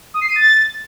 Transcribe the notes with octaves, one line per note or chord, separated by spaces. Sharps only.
D#6
C7
D#7
A6